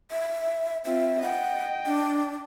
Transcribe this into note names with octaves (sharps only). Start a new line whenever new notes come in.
E5
C4 F4 E5
D#5 F#5 G5
D4